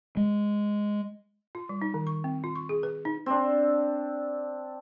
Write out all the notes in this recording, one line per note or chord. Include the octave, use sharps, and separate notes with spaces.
G#3
F4
G3
D#4
D#3
C#6
C4
F4
C#6
G#4
B4
D#4
C4 D4